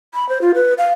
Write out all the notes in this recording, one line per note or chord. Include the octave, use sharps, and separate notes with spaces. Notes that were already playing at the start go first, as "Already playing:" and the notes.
B5
C5
F4
B4
F5